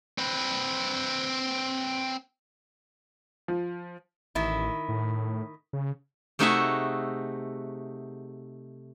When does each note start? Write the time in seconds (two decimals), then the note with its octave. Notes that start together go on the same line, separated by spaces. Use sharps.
0.18 C4 B4
3.48 F3
4.35 A1 D#3 E4
4.89 A2
5.73 C#3
6.39 C3 A3 D#4 F#4 G#4 E5